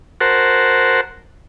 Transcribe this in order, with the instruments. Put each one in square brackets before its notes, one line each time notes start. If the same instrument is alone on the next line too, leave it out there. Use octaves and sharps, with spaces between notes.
[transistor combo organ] F#4 A#4 C5 F#5 A5